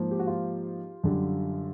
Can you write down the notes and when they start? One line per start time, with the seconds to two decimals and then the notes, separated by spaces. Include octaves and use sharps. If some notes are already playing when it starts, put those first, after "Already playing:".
Already playing: G#2 F3 A#3
0.11 G4
0.19 F#4
0.27 F4 G4
1.04 F#2 D3 G3